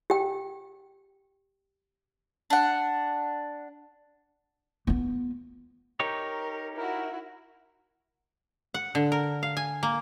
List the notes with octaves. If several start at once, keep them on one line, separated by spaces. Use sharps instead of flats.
G4 G5
D4 F#5
B3 F4
D#4 G4 A#4 C#5
E4 F#4 A#4
F#5
D3
A#4
F5
G#5
A#3